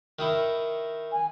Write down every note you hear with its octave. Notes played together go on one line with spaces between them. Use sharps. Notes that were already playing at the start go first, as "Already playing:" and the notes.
D#3 D#4 E4
G#5